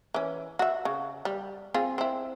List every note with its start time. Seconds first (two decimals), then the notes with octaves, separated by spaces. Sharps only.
0.14 E3 C#4
0.59 F#4 E5
0.85 C#3
1.25 G3
1.74 C4 F4 G#4
1.98 C4 E4